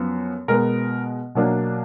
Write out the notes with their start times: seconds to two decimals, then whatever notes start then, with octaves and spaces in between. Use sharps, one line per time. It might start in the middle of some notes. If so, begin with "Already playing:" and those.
Already playing: F#2 F3 B3
0.48 B2 G#3 B3 A#4
1.35 B2 F#3 A#3 D4